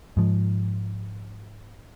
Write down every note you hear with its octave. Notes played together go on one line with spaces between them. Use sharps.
G#2 F3